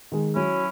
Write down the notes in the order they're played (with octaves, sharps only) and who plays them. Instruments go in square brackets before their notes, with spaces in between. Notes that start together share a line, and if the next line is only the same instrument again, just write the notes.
[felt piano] D#3 G#3
[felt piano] F#3 [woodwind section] C#4 E4